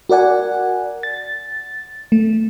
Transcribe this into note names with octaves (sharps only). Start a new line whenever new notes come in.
F#4 A#4 D5 F#5 G#5
A6
A3